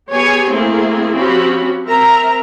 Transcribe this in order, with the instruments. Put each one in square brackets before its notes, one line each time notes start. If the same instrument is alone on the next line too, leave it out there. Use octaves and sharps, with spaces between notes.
[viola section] B3 G4 G#4 C#5 G#5
A3 A#3 C4 E4 G#4
F3 C4 C#4 F#4 G4 B5
C4 A#4 E5 A#5